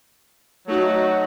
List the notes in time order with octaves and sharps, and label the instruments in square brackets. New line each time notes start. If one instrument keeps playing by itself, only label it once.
[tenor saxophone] F#3 [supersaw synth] A3 D#4 F#4